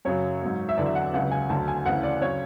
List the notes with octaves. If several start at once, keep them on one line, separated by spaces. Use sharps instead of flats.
F#2 C#3 F#3 C#5
G#2 F#3
E5
E2 D3 F#3 D5
E5
F#5
C#2 C#3 F#3 F#5
G#5
D2 D3 F#3 A5
G#5
D2 C#3 E3 F#5
D5
C#3 F#3 C#5